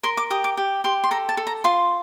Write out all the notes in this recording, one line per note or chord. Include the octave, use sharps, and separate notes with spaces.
A#4 C6
D6
G4 D#6
D6
G4
G4 C6
C6
A4 A#5
A5
A4
A#5
F4 C6